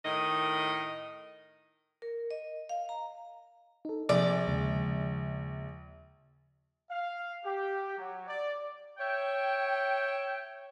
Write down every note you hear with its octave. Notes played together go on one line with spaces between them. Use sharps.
A2 D#3 D#5
A#4
D#5
F5
A#5
D#4 A4
A#1 C3 D5
D#2 C#3 G#3
F5
G4
F#3
D5
C#5 E5 G5